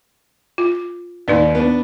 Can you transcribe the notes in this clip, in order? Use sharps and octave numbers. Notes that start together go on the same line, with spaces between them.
F4
D#2 D#4 B4 D5
B3 D4